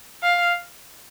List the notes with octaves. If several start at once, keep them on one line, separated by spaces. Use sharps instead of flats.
F5